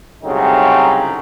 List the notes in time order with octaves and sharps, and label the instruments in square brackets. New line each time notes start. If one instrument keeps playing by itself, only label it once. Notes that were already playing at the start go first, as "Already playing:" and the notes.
[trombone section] C2 C#3 F#3 A3 C4 D#4